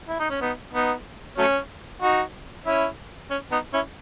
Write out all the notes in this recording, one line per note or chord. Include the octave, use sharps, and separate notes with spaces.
E4
D#4
C#4
B3 D#4
B3 D#4
F#3 A3 C#4
D#4 F#4
C#4 E4
C#4
B3 D#4
C#4 E4